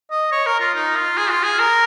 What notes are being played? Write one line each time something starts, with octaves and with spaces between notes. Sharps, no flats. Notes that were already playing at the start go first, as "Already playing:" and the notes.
D#5
C#5
A#4
F4
D#4
F4
G#4
F4
G#4
A#4